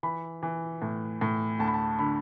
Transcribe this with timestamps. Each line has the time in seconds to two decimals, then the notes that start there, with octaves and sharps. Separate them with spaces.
0.03 E3 B5
0.43 E3
0.82 A2
1.21 A2
1.59 D2 A5
1.68 B5
1.74 A5
1.99 D3 B5